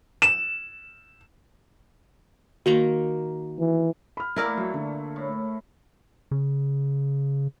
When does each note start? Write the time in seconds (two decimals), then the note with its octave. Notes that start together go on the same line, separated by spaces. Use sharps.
0.22 E7
2.66 D#3 A#3 F#4 A#5
3.59 E3
4.17 B5 F6
4.36 E3 A3 A#3 E4 A#4 D5
4.58 A#2 F#3 A3
4.74 D3
5.16 A2
6.31 C#3